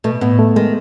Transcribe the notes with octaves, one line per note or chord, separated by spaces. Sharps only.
B2 A3
A2 B3
A3
D#3 G#3